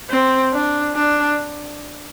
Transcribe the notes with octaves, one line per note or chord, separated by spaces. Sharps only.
C4
D4
D4